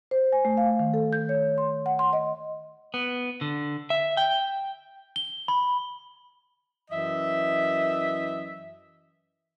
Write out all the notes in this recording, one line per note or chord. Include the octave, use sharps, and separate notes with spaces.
C5
G#5
A3
F5
D#3
A4
G6
C#5
C6
F#5
C6
D#5
B3
D3
E5
G5
G7
B5
F#2 E3 D#5 E5